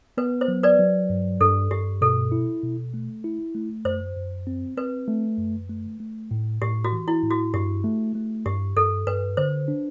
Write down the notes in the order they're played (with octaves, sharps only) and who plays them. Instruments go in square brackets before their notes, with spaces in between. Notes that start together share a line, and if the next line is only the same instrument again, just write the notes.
[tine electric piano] B3 [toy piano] B4
[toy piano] C5
[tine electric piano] F#3
[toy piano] B4 D5
[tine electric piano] F#3
G2
[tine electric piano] G2 [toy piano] A4
[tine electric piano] G2 [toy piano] G4
[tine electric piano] B2 [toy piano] A4
[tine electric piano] E4
B2
A3
E4
A3
[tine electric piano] F#2 [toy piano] C5
[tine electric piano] F#2
C4
[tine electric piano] C4 [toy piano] B4
[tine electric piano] A3
F#2
A3
A3
A2
[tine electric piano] A2 [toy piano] G4
[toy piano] F#4
[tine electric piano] E3
[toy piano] E4
[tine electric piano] A2
[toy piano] F#4
[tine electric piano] G2 [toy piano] G4
[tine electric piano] A3
A3
[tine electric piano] G2 [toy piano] G4
[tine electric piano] G2 [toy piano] A4
[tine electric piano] G2 [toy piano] B4
[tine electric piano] D3 [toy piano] C5
[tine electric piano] D4